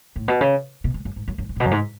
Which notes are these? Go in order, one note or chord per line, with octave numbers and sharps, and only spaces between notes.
A2
B2
C#3
B2
G#2
F#2
G#2
F#2
F#2
G#2
A2
B2
F#2
G#2